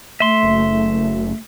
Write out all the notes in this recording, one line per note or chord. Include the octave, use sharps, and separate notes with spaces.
A3 E5 C6
F#1